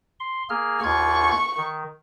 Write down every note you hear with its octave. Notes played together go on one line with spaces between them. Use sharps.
C6
A#3 G#4 F6
D#2 F4 C#6 G#6
D#3